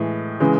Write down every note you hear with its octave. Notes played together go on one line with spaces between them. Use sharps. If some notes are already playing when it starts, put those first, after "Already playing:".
Already playing: A2 E3 G#3
C#3 E3 G#3